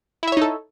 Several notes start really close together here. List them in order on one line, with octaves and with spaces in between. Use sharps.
E4 E5 C#5 D#4 A4